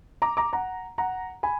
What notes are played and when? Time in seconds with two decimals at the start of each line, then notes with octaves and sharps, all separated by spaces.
0.22 A#5 D6
0.37 A#5 D6
0.53 F#5 A#5
0.98 F#5 A#5
1.43 G#5 B5